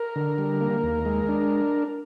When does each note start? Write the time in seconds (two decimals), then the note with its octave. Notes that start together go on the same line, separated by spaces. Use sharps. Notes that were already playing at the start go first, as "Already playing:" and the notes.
Already playing: A#4
0.16 D3
0.38 G3
0.61 A#3
0.83 D#2
1.05 G#3
1.28 D4